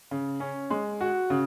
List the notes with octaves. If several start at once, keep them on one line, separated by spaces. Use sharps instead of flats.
C#3
C#4
G#3
F#4
C#3